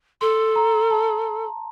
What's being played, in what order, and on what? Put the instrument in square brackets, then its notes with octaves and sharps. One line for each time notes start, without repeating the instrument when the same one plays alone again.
[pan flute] A4 [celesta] C6
[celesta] A#5
A5